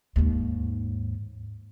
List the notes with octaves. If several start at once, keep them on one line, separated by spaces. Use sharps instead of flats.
D#2 G#2